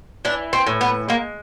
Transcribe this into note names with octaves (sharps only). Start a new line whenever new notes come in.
E3 D4
C4
A2
B3
G#3 A#3